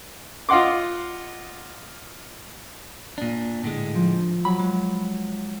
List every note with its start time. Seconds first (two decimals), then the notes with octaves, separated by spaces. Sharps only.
0.49 F4 D#5 F#5 C6 D6
3.18 A#2 D4
3.64 A2 D3 G#3
3.95 F3
4.45 F#3 B5
4.60 G#3